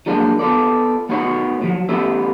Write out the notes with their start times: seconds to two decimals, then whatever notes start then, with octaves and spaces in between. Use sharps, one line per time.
0.06 F3 F#3 G#3 A#3 D4
0.39 B3 F4 A4 D5
1.09 A3 B3 D#4 F#4 C#5
1.62 A2 F3 F#3
1.89 G3 A3 B3 C#4 E5